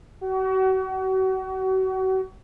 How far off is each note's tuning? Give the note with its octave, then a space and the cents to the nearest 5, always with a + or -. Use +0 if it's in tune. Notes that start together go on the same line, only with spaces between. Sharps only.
F#4 +35